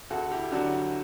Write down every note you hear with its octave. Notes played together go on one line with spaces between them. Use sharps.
D2 F#4 A4
E4 G4
D3 F#3 D4 F#4